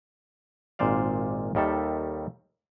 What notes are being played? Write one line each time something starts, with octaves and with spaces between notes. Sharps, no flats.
G#1 A#2 C5 D5 F5
D#2 D#3 G3 A4 E5